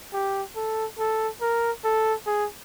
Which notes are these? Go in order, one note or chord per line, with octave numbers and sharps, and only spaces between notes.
G4
A4
A4
A#4
A4
G#4